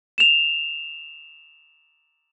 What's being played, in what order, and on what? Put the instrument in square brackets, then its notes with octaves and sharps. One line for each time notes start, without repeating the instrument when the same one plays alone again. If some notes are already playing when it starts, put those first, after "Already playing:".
[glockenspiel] E7 F7